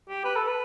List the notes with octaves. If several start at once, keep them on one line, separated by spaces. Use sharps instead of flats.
G4
B4
A4
B4